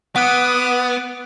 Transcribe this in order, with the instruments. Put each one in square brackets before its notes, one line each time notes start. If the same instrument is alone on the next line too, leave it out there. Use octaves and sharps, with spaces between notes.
[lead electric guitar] B3 [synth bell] F#5 F#6 [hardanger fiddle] D6 D#6